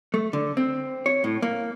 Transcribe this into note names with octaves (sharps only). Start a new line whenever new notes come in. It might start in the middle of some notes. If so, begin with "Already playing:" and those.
A3
D3
C4
C#5
A2
A#3